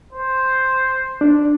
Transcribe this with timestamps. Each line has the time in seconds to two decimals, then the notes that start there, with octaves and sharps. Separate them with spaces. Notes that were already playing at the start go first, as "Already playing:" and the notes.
0.13 C5
1.21 D4